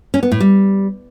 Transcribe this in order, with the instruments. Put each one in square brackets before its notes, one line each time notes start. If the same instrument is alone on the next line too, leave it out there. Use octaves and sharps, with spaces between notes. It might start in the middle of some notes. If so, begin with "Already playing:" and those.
[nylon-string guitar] C#4
B3
A2
G3